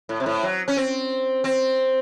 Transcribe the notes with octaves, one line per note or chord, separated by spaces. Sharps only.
A2
C3
A2
F#3
C#4
C4
C4